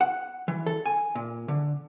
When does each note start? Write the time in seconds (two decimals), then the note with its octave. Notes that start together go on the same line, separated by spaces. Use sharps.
0.01 F#5
0.48 E3
0.66 A4
0.86 G#5
1.15 A#2
1.48 D3